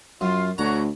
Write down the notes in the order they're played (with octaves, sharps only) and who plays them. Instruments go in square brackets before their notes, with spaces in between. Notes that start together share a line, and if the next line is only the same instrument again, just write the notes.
[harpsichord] F#2 [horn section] F4
[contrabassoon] D2 [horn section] D3 F#4 C#5 [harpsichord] A#5